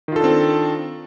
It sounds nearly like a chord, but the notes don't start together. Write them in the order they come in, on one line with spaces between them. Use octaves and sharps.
D#3 F4 A4 D4 C4